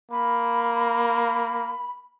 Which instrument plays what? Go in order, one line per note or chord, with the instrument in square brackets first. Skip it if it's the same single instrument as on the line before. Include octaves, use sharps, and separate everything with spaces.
[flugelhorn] A#3 [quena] B5